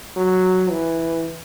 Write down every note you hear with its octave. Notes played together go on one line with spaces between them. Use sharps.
F#3
E3